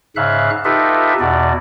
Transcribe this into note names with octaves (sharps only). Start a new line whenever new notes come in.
G#2 C#3 E5 F5 F#6
D#4 F4 G4 A4 B4 E5
E2 B2 D5